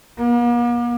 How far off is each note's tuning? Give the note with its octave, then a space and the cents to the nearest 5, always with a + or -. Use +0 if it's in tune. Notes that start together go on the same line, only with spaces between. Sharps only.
A#3 +45